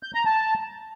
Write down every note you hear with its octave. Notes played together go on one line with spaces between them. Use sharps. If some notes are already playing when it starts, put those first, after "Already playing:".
G6
A#5
A5